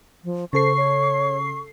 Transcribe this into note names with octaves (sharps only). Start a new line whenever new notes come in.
F3
C#3 A4 C5 C#6 C7
C#5